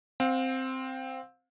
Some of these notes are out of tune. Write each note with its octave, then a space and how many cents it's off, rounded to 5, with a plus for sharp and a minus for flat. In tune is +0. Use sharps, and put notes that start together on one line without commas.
C4 +0 F5 +35